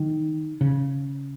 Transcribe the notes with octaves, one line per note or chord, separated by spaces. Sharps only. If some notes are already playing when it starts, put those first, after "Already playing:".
Already playing: D#3
C#3